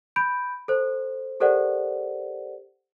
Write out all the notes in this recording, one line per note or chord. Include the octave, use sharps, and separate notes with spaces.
B5 G6 D7
A4 C5
G4 A4 A#4 C5 D5 F#5